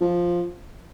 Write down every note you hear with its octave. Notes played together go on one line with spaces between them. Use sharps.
F3